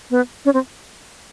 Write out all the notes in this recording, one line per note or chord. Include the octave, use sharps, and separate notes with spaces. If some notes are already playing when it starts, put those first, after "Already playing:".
B3
C#4
C4